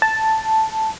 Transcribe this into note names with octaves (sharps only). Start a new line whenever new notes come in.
A5